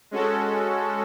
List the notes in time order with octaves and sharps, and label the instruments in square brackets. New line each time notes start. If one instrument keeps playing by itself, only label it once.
[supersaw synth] G#3 C#4 F#4 A4